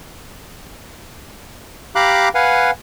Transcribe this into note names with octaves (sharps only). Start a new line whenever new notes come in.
G4 F5 A#5 B5 D6 F#6
B4 F5 F#5 G#5